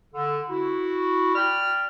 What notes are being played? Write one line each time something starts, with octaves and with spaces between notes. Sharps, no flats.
D3
E4 F#4
D5 G5 B5 F6